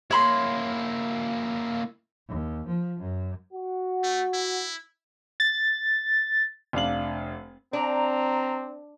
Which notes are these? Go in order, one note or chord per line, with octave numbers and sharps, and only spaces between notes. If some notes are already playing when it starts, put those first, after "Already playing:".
A#3 E4 C#5 B5 C6
D#2
F3
F#2
F#4
A3
E4
A6
F1 D4 F5 F#7
C4 D4 A#5